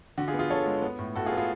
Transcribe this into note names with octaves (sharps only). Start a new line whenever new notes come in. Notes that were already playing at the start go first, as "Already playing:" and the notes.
D3 F#4
F4 G#4
B3
F4 G#4
D3 A4 C#5
G#3
B3
A2
A2 F#4 A4
F4 G#4
B3
F4 G#4